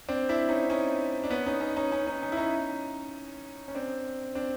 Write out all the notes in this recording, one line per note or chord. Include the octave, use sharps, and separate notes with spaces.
C4 D4
D4 E4
C#4 D#4
C#4 D#4
D4
B3 C#4
C#4 D#4
C#4 D#4
C#4 D#4
C#4 D#4
C#4 D#4
C#4 D#4
E4
C#4 D#4
C#4
C4 D4
C4 D4